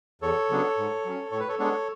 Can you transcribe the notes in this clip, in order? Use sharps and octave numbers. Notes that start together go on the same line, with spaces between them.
E2 A4 C#5
C#3 F#3 B3 D4
G#2
F#3 C#4
A2 C#5
B4
A4 C#5
G#3 B3 D4 A4 C#5